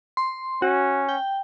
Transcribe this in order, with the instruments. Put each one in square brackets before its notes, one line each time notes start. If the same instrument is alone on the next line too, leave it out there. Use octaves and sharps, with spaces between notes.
[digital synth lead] C6
[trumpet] C#4 [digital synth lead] F#4
[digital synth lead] G5